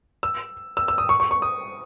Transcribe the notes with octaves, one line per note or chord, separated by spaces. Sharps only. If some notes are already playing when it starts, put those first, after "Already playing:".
E6
E6
E6
D#6
C#6
C#6
C#6
D#6